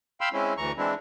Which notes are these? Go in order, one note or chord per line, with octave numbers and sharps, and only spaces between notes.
F5 G5 B5 C6 E6
G#3 C4 C#4 E4
D2 E3 A#5 C#6
E3 G#3 C4 D4 E4